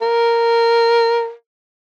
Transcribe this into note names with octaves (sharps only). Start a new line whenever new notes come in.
A#4